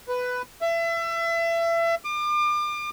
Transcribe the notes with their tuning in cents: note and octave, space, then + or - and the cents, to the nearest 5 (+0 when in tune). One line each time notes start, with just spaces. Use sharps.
B4 +10
E5 +30
D6 +35